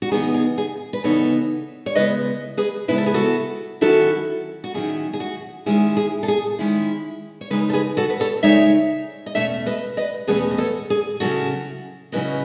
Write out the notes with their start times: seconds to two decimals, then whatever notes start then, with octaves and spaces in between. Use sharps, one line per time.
0.02 F#4
0.12 C#3 E3 B3 D#4 G#4
0.34 G#4
0.58 G#4
0.93 B4
1.04 C#3 E3 B3 D#4 A4 C#5
1.86 C#5
1.95 C#3 G#3 B3 E4 B4 D#5
2.57 G#4 B4
2.88 C#3 G#3 B3 E4 B4
2.98 A4
3.06 G#4
3.14 F#4 A4
3.81 D#3 F#3 C#4 E4 F#4 A4
4.64 F#4
4.74 D#3 F#3 C#4 E4 G#4
5.13 G#4
5.20 F#4
5.66 D#3 G#3 C#4 E4 G#4
5.97 G#4
6.23 A4
6.28 G#4
6.59 D#3 G#3 C#4 E4
7.41 C#5
7.50 C#3 G#3 D#4 G#4 B4
7.69 A4
7.73 G#4 B4
7.97 F#4 A4
8.10 B4
8.20 A4 C#5
8.43 C#3 G#3 D#4 C#5 E5
9.26 D#5
9.35 E2 B2 A3 C#4 C#5 E5
9.66 B4 D#5
9.97 B4 D#5
10.27 E2 B2 A3 C#4 G#4 B4
10.51 D#5
10.58 A4 C#5
10.90 G#4
11.20 C#3 F#3 C#4 E4 F#4 A4
12.12 C#3 F#3 C#4 E4 B4 D#5